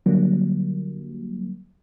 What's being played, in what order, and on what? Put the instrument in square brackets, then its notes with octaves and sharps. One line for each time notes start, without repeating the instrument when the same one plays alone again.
[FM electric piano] D3 F#3 G3 A#3